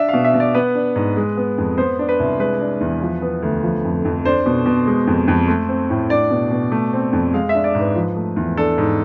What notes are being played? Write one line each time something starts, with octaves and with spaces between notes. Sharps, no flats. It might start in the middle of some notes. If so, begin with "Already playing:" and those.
Already playing: D4 E5
B2 F5
E5
B2
D5
B3 B4
D4
G#2
G#3
B3
F2
B3 C5
D4
B4
C2
G#3 B4
D4
E2
F3
B3
D2
F3
F2
F2
D4 C5
B2
B2
G#3
F2
F2
A3
C4
A2
D4 D5
B2
B2
A3
C4
F2
G#3 F5
E5
D4
D5
G#2
B4
F3
A3
E2
D4 A4
G#2